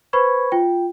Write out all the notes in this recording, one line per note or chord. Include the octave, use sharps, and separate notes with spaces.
B4 C5 B5 C#6 G#6
F4 G5